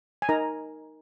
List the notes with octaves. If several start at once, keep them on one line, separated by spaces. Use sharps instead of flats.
G#5
D#4 A#4 A#5